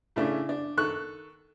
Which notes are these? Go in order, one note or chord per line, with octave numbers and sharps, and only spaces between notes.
A2 C#3 A3 D4
D4
D#3 A4 C#6 F#6